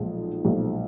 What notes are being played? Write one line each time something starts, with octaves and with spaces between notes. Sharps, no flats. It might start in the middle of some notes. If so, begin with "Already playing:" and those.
Already playing: B1 A#2 F3 G#3
B1 A#2 F3 G#3